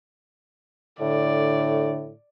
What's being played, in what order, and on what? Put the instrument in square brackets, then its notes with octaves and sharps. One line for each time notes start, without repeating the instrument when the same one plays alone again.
[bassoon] A2 [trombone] D3 [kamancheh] D5